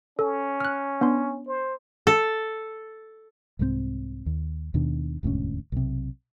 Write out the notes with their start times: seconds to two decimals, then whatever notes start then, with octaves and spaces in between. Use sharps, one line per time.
0.19 C#4 A4
0.60 F6 F#6
1.01 B3 D4 C6
1.47 C5
2.07 A4
3.59 C2 G#2 G3 C4
4.26 D#2
4.74 D#2 B2 D#3 D4
5.23 E1 D2 G#2 C#4
5.72 B1 C3